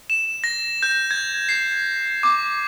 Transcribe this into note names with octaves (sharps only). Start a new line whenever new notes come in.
E7
A#6
G6
G#6
C7
D6